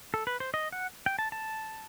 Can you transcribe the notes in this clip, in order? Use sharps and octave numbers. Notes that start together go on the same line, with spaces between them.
A4
B4
C5
D#5
F#5
G5
A5
A5